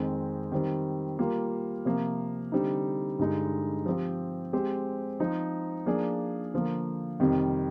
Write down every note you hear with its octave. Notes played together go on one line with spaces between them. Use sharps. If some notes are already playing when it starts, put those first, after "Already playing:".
Already playing: F2 D#3 G#3 C4
D#3 G3 C4
G3 A#3 F4 A#4
C3 F3 A#3
D3 G3 C4 D#4
G2 D3 G#3 D#4
F3 C4 G4
G#3 C4 G4 C5
F3 C4 D#4
F3 A#3 D4 G#4 D5
D3 F3 A#3
F2 C3 D#3 G3